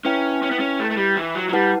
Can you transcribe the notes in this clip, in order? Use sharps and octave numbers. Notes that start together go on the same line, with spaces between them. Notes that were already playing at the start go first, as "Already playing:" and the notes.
C#4 E4 B4 E5 G5
C#4
B3
C#4
A3
A3
G3
E3
F#3
F#3
G3 E4 B4 F#5 A5